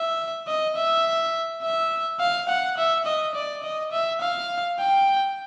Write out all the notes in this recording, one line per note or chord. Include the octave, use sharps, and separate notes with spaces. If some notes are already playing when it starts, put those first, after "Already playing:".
Already playing: E5
D#5
E5
E5
F5
F#5
E5
D#5
D5
D#5
E5
F5
G5